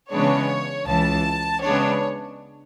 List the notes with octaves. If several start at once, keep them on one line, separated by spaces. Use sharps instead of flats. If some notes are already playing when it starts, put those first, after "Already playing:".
C#3 E3 G#3 B3 D4 C#5
C#2 C#3 E3 A5
C#3 G#3 B3 D4 C#5